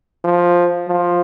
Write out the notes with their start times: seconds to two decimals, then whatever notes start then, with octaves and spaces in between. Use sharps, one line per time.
0.24 F3
0.88 F3